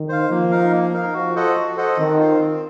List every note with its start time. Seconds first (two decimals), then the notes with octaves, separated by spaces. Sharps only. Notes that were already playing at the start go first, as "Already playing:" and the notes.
Already playing: D#3
0.09 C5 F5
0.30 F3 A#3
0.51 D#4 A#4 F5
0.72 A#3
0.93 D#4 A#4 F5
1.14 F3 F#4
1.35 A4 C5 D#5 F#5
1.55 F#4
1.77 A4 C5 D#5 F#5
1.98 D#3 C4
2.19 F4 C5 F5
2.40 C4